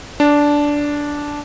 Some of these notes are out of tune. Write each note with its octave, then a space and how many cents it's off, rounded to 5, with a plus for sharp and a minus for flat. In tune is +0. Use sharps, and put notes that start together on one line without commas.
D4 -10